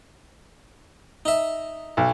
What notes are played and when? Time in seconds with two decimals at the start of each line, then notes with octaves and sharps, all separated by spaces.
1.25 D#4 E5
1.97 B1